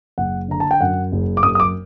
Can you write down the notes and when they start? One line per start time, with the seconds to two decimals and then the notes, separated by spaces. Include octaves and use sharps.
0.18 F#1 F#5
0.48 D3 A#5
0.60 A5
0.71 G5
0.81 F#2 F#5
1.12 F#1
1.37 D6
1.43 F#2 D#6
1.55 D#6
1.60 D6